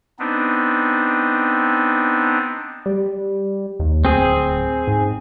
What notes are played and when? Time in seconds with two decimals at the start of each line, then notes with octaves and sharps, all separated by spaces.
0.19 B3 C4 D4 D#4
2.86 G3
3.80 D#2
4.05 D1 C4 G#4
4.87 G#2